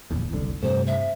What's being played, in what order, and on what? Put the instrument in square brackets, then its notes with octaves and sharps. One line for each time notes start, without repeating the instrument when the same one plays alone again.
[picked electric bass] D1 A#1 E2
F#1 C2 D3
[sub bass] G2 [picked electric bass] C3 G3 A3 [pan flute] C5
[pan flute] E5